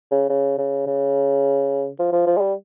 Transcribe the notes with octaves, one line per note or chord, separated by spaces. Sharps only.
C#3
C#3
C#3
C#3
F3
F3
F3
G#3
G3